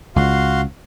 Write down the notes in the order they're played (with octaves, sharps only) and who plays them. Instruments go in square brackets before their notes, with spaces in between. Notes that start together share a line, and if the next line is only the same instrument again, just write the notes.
[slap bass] C#2 [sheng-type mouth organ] F#4 F5 C6